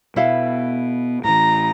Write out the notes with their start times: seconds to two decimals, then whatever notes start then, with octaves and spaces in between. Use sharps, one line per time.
0.16 B2 E4 A4 F5
1.24 A2 E3 A#5